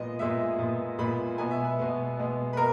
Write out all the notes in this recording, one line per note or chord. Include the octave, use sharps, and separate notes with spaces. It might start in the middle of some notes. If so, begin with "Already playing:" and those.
Already playing: A#2 G#3 B3 D#5
A#2 G#3 B3 E5
A#2 G#3 B3
A#2 G#3 B3 B5
B2 G#3 B3 G#5
E5
B4
B2 G#3 B3
B2 G#3 B3
B4
B2 A#4